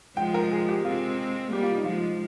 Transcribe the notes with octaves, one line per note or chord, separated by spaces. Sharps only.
F3 G#3 G5
A#4
G#4
G4
G#3 C4 F4
G3 A#3 G4
F4
D#4
F3 G#3 F4